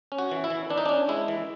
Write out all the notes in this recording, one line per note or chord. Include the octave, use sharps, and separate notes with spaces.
C#4
F#4
E3
E4
E3
E3 D4
D#4
C#4 D4
G#3 E4
E3